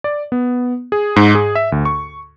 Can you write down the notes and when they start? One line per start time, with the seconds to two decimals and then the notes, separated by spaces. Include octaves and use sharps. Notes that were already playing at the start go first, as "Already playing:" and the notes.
0.04 D5
0.32 B3
0.92 G#4
1.16 G#2
1.35 G#4
1.55 E5
1.72 D2
1.85 C#6